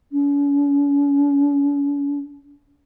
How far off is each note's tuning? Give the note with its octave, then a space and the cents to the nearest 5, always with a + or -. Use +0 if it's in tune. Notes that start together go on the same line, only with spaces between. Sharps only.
C#4 +40